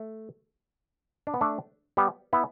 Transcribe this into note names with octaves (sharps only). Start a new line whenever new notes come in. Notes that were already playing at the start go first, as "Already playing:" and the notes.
Already playing: A3
D4
B3
A3 D4
G3 B3
B3 E4